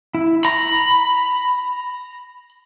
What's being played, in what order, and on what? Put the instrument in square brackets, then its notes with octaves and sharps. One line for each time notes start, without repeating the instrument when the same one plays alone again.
[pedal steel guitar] E4
[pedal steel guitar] A#5 [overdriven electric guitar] B5